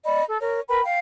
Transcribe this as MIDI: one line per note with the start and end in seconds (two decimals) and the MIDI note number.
0.05 0.22 74
0.05 0.22 75
0.05 0.22 83
0.28 0.38 69
0.40 0.60 70
0.40 0.60 73
0.68 0.81 70
0.68 0.81 71
0.68 0.81 79
0.68 0.81 83
0.83 0.98 77
0.83 0.98 79